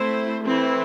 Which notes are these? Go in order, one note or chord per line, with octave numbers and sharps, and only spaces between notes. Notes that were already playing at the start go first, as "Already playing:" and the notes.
Already playing: A3 C4 E4 C5
E3 A3 C4 E4